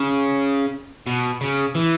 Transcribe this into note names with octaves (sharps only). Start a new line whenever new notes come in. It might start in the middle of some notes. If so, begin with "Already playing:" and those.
Already playing: C#3
B2
C#3
E3